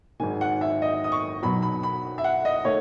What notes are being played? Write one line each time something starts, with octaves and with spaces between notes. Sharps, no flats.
G#1 G#2 D#3 G#3 G#5
F#5
E5
D#5
D#6
C#6
B1 B2 F#3 B5
B5
B5
E5
F#5
D#5
D#3 A3 C#5